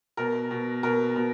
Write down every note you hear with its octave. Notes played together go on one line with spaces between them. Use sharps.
B2 A#4
B2
B2 A#4
B2